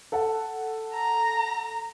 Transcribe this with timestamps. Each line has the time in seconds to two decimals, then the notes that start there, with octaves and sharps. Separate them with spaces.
0.12 A4 F#5 A5
0.93 A#5